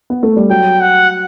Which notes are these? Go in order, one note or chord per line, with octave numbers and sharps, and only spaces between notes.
B3
A3
G3
F#3 G5
F#5